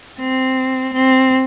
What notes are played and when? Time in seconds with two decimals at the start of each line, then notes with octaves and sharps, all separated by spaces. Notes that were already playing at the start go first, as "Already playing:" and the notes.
0.20 C4
0.94 C4